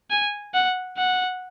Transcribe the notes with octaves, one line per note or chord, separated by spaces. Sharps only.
G#5
F#5
F#5